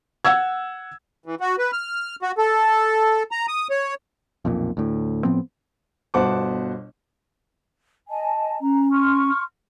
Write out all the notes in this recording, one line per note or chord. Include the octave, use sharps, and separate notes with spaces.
F#5 E6 G#6
E3
F#4
B4
F6
F#4
A4
A#5
D#6
C#5
B1 F2 A#2
D2 A2
A2 F3 B3 C4
G1 B2 C5 F#5 A5 D6
D#5 G#5 A5
C#4 A#5
C6 C#6 F6